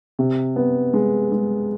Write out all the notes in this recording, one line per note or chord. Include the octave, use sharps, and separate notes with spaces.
C3
B3
G#3
G#3